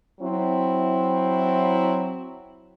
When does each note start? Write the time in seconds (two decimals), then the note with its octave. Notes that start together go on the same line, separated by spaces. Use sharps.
0.20 F#3 C4 E4